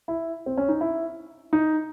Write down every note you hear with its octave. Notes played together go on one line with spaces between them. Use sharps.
E4
C4
C#4
D#4
E4
D#4